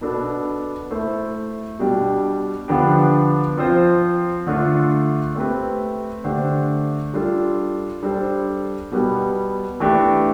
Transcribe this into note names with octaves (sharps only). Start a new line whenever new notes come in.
B2 B3 D4 A4
A3 E4 A4 C5
B2 G3 D4 G4
D3 F3 B3 D4 G4
F3 C4 F4 C5
D3 A3 D4 F4
A3 C4 G4 B4
D3 A3 D4 G4 C5
G3 D4 F4 A4
G3 D4 A4 C5
B2 G3 B3
E3 A3 D4 G4